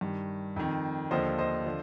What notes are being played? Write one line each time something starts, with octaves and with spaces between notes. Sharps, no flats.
G2 D#3
F2 D#3
D#2 D3 F3 C5 D#5
C5 D#5
D3 F3